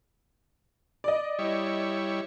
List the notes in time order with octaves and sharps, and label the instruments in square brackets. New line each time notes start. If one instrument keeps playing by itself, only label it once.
[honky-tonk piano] D5 D#5
[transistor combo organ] G3 E4 C#5